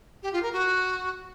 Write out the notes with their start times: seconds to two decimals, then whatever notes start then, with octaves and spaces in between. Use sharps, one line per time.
0.23 G4
0.33 F4
0.43 A#4
0.52 F#4